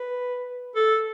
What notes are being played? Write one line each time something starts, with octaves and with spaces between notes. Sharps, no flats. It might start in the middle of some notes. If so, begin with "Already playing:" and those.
Already playing: B4
A4